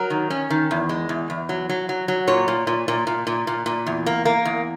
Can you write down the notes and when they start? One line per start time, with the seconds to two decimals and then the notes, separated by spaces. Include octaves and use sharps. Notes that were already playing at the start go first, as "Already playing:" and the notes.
Already playing: F#3 A#4
0.10 D#3
0.30 C#4
0.50 D#3
0.71 E2
0.89 G#3
1.09 E2
1.30 E2
1.49 F#3
1.69 F#3
1.89 F#3
2.08 F#3
2.27 A#2 C#5
2.48 A#2
2.67 A#2
2.88 A#2
3.07 A#2
3.27 A#2
3.47 A#2
3.66 A#2
3.87 E2
4.06 A#3
4.25 A#3
4.45 E2